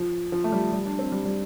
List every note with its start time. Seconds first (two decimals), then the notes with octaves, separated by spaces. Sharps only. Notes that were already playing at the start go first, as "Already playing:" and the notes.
Already playing: F3
0.32 F3
0.44 A3
0.52 G3
0.72 G3
0.86 D4
0.99 C4
1.12 G3
1.25 G3